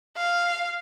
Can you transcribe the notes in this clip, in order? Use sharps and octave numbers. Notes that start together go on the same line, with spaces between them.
F5